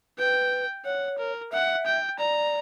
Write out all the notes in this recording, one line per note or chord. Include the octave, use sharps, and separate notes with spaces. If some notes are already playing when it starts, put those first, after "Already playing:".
B4 G5
C#5 F#5
A#4
E5 F#5
G5
D5 A#5